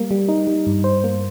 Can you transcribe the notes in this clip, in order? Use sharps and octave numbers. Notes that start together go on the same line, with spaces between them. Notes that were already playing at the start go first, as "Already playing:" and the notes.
Already playing: G3 A#3
G3
D#4
G3
G2
C5
A#3